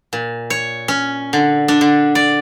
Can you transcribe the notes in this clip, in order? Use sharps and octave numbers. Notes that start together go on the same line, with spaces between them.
A#2
C#5
C#4
D3
D4
D3
D5